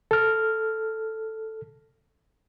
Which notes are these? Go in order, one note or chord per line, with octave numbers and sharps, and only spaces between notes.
A4 F6